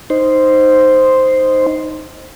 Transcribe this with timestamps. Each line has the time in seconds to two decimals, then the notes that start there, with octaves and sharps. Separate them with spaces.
0.10 D#4 C5